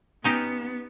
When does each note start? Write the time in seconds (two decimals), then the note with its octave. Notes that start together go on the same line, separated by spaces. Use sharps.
0.24 B3 C#4 D#4 G4